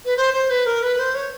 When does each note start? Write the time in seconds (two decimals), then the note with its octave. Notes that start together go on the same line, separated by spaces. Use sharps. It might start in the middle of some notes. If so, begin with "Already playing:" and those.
0.05 B4
0.17 C5
0.33 C5
0.49 B4
0.65 A#4
0.82 B4
0.98 C5
1.14 C#5